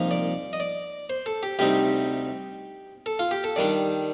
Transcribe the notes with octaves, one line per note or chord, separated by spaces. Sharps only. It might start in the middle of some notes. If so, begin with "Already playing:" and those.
Already playing: C2 A#2 F3 A#3 D#4
D5
D#5
D5
C5
A4
G4
D2 C3 G3 C4 D#4 G4
A4
F4
G4
A4
D#3 G3 D4 D5